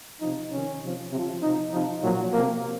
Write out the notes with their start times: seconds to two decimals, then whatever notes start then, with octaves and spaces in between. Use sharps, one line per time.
0.21 C3 F3 D#4
0.52 C3 D#3 C#4
0.83 C3 F3
1.12 C3
1.17 F3
1.43 C3 F3 D#4
1.72 C3 F3 D#4
2.03 A#2 F3 F#3
2.32 C3 F3 A#3